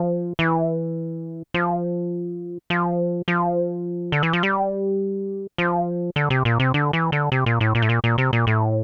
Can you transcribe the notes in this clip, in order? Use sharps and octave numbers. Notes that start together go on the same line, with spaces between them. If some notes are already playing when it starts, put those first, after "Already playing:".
Already playing: F3
E3
F3
F3
F3
D3
E3
F3
G3
F3
D3
C3
A#2
C3
D3
E3
D3
C3
A#2
A2
A#2
A2
A#2
A#2
C3
A#2
A2